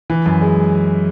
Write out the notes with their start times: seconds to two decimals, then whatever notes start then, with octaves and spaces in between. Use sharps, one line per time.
0.10 E3
0.26 F#2
0.41 G#3